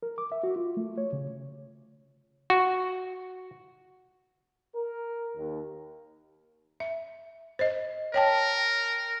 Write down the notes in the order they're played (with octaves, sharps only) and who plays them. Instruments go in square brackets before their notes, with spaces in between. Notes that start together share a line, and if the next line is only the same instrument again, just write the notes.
[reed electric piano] A#4
D6
E5
F#4
F4
A3
C#5
C#3
[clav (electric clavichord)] F#4
[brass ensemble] A#4
D#2
[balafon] E5
C5 D#5
[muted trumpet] A#4 [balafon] C#5 G5 A5